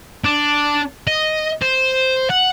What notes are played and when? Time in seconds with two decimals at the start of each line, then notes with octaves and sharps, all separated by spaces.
0.24 D4
1.07 D#5
1.62 C5
2.30 F#5